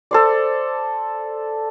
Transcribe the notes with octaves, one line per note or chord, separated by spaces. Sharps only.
A4 C5 D5